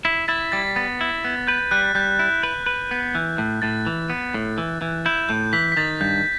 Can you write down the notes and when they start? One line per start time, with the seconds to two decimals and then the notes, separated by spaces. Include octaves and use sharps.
0.05 E4 B6
0.28 E4 A6
0.52 G3 A6
0.76 B3 A6
1.01 E4
1.25 B3
1.47 B4 G6
1.71 G3 F#6
1.95 G3 G6
2.19 E4
2.43 B4
2.66 B4
2.91 B3
3.15 E3
3.38 A2
3.62 A2 A6
3.87 E3
4.10 B3
4.34 A2
4.58 E3
4.82 E3
5.06 E4 G6
5.29 A2 G6
5.53 E3 B6
5.72 B6
5.77 D#3 A6
6.01 G2 G6